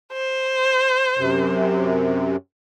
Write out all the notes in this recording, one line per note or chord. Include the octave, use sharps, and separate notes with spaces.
C5
F#2 C3